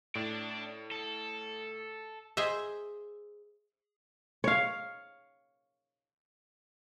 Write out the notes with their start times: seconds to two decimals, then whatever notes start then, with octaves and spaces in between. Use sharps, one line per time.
0.15 A2 D4 D5
0.92 A4
2.37 G#4 C5 D#5 E5
4.44 C#5 F5